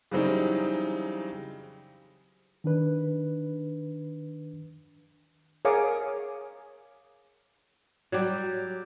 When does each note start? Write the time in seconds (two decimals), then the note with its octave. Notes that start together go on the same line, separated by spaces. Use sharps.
0.11 C#3 E3 F#3 G3 C4 D#4
2.64 D#3 D4 B4
5.65 G#4 A#4 C#5 F5 D6 D#6
8.12 F#3 G3 G4